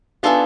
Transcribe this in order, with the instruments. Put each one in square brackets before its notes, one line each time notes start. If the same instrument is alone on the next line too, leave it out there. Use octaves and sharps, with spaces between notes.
[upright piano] B3 D4 [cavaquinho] F4 A4 E5 G#5